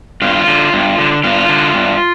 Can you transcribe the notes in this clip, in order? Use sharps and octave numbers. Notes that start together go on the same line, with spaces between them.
G2 F4
D3
G2
D3
G2 F4
D3
G2